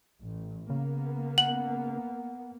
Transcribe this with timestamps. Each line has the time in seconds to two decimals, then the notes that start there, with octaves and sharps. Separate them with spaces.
0.23 A1
0.70 C#3 A#3 B3
1.38 F#5 F#7